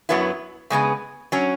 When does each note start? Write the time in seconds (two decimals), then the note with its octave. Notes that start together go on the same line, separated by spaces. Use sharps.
0.09 F#2 F#3 B3 E4
0.70 C#3 G#3 B3 G#4
1.32 F#3 C#4